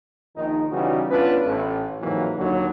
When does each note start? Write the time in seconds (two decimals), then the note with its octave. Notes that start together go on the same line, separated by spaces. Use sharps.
0.36 A#1 D#3 D#4
0.71 C#3 E3 G3 D#4 F#4
1.09 B3 C#4 D4 F4 B4
1.45 A1 A2
2.01 F2 G#2 C3 E3 F#3 A#3
2.37 D#2 D3 F#3